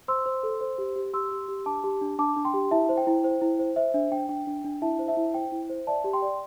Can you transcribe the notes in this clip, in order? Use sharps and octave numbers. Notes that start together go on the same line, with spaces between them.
C5 C6 E6
C5
A4
C5
G4
G4
G4 C6 E6
G4
G4
D4 A5 D6
G4
D4
D4 A5 D6
D4
G5 C6
G4
E4 E5 A5
C5
G5
E4
C5
E4
C5
C5 E5
D4 E5
D4 G5
D4 G5
D4
D4
E4 E5 A5
C5
E5 A5
E4
C5 G5
E4
C5
D5 E5 A5
G4
G5 C6
D5